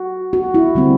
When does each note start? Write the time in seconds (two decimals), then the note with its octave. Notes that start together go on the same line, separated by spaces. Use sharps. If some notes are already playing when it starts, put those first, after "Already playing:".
Already playing: F#4
0.33 F#4
0.54 E4
0.75 D3 G3 C4